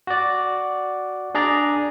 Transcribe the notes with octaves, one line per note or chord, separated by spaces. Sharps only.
F#4 D5
D4 G#4 D5 A#5